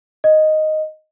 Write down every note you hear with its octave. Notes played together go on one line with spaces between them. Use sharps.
D#5